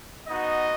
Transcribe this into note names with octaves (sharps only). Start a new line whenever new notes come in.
B3 D#4 F#4 D#5